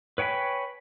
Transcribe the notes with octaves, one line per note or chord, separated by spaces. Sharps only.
B4 C#5 G5 G#5 B5